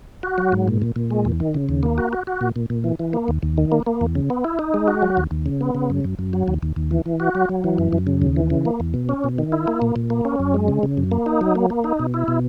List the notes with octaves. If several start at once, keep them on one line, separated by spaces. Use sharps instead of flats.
F#4
F#3
G#2
A#2
A#2
A#2
G#3
E2
D#3
C#3
D#2
A#3
F#4
F#4
F#4
A#2
A#2
A#2
E3
E3
A#3
D#2
D#2
D#3
A#3
A#3
E2
C#3
B3
E4
D#4
G#3
F#4
F#3
D#2
D#2
C#3
B3
C#3
F#2
F#2
F#2
F#3
D#2
D#2
D#2
E3
E3
F#4
F#3
F#3
E3
F#2
F#2
C#3
D#2
E3
C#3
A#3
E2
B2
C#4
B2
D#3
E4
A#3
A#2
A#2
A#3
C#4
F#2
G#3
C#3
C#3
F#2
A#3
D#4
F#3
A#3
A#3
D#4
B2
E4
B2